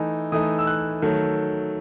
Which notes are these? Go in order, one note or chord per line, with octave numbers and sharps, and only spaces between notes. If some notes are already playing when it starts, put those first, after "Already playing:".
Already playing: E3 A3 D#4
E3 A3 D#4 D#6
E6
F#6
D#3 F#3 A3